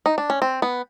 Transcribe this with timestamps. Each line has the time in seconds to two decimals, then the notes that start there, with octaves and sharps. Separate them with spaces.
0.06 D#4
0.18 D4
0.30 C#4
0.42 C4
0.62 B3